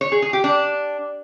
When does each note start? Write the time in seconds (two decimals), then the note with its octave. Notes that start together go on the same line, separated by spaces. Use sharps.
0.01 C#5
0.12 G#4
0.22 G#4
0.33 G4
0.44 D4